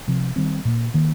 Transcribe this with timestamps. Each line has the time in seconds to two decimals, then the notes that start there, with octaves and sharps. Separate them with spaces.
0.08 C3 F3 C4
0.36 D#3 G3 C4
0.65 A#2 A#3
0.94 D#3 A#3